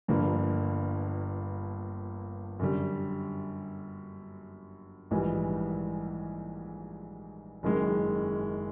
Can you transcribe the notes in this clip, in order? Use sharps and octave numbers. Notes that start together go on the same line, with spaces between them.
G1 G2 D3 F3 A#3
F#2 D3 G3
A#1 G#2 E3 G3
F#1 F#2 D#3 G#3